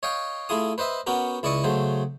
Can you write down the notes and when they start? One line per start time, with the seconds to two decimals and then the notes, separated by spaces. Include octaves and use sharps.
0.03 C#5 D#5 F5 G5
0.49 A3 E4 F4 G#4 D#6
0.78 B4 C5 D#5 E5
1.07 B3 C#4 F#4 G4 A#4
1.43 C#2 E4 D5 D#5 C#6 D#6
1.64 C#3 F#3 A3 C5